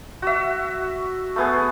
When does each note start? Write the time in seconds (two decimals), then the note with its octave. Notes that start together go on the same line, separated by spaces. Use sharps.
0.22 F#4 E5
1.36 A3 B3 G#4